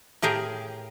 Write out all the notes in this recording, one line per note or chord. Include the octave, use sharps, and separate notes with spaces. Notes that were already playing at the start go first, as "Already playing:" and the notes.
A2 G4 G#4 A#4